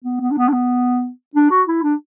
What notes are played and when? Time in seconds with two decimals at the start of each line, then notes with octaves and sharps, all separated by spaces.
0.04 B3
0.21 B3
0.31 D4
0.38 B3
0.48 D4
0.53 B3
1.35 D4
1.51 F#4
1.68 E4
1.83 D4